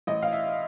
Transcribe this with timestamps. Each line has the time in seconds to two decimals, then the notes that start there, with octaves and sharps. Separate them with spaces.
0.07 A1 D#5
0.22 F5
0.32 E5